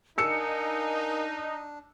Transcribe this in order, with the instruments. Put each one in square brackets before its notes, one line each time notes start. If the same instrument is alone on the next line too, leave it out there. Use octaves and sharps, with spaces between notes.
[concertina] D4 [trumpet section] D#4 [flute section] A#4 F5 G#5 [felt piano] E6 C#7